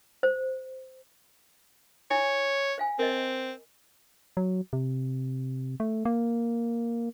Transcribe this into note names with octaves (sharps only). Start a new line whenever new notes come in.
C5
E4 C#5 G#5
C5 F5 G#5
C4 A#4 D#5
F#3
C3
A3
A#3